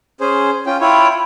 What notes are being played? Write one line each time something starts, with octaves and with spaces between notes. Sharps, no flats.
C#4 G#4 C5
C#4 F4 G5
E4 F4 C#5 G5 B5